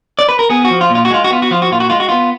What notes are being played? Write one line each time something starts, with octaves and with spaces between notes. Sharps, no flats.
D5
B4
A#4
B3 G#4
F#4
F3
F4
A#2
F4
F#4
G#3 F4
F#4
B3 F4
F#4
F3 F4
F#4
A#2 F4
F#4
G#3 F4
F#4
B3 F4